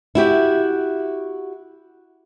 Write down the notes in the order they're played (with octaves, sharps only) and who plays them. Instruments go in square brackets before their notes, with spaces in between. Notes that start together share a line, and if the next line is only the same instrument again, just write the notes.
[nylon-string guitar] E4 F#4 G4 E5